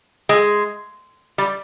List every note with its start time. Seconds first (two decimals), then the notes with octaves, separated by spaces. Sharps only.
0.29 G#3
1.38 G3